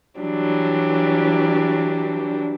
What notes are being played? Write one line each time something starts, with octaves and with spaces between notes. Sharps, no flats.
E3 F#3 G3 D4